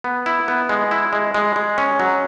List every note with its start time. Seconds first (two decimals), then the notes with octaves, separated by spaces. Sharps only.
0.04 B3
0.26 E4
0.48 B3
0.69 G#3
0.91 E4
1.13 G#3
1.34 G#3
1.56 G#3
1.78 C#4
2.00 F#3